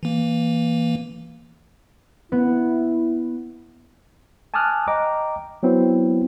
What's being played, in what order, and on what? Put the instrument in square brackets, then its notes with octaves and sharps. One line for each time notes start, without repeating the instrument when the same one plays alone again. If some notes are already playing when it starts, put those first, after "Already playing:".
[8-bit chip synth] E3 A#3
[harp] B3 [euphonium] E4
[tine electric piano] G#5 A5 D6 D#6 F6 F#6
D#5 G5 A#5 D6
F#3 B3 C4 E4